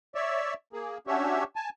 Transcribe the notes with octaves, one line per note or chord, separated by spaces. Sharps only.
C#5 D5 E5
A#3 G#4
C#4 D4 F#4 G4 C#5 E5
G#5 A5